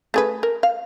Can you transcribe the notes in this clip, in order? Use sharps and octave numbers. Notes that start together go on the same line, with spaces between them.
A3 G#4 B4
A#4
F5